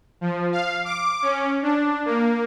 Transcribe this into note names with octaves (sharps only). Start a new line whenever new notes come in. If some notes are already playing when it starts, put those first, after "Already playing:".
F3
F5
D6
C#4
D4
A#3